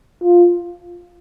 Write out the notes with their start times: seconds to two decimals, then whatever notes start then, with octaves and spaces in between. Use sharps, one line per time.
0.23 F4